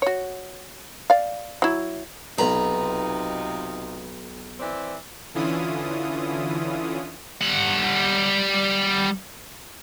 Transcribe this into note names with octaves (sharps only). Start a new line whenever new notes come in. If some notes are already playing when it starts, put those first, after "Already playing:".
F#4 C#5
D5 F5
F#3 E4
B1 C3 D#4 F4 B4 A#5 B5
E3 C4 D5
D3 E3 C#4 E4 F4 D#6
G3 F#5